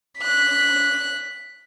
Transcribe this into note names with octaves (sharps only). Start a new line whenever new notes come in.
F#6 B6